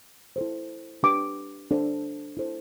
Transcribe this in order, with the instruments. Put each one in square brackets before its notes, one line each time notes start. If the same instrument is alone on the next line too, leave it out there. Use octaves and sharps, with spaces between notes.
[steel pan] E4 A4 C5
D4 G4 B4 D6
D4 A4 C5
E4 A4 C5